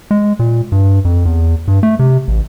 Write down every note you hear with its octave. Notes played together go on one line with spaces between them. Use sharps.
G#3
A#2
G2
F2
E2
G2
A3
C3
A1